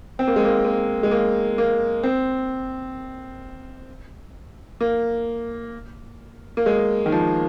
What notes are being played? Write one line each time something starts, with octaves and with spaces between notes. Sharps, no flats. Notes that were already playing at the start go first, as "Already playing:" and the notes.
C4
A#3
G#3
A#3
A#3
G#3
A#3
A#3
C4
A#3
A#3
G#3
D#3
F3